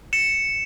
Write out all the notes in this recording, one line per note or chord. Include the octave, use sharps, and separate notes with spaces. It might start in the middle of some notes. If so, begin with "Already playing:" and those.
C#7 E7